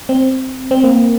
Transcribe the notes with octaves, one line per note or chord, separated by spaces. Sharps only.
C4
C4
A#3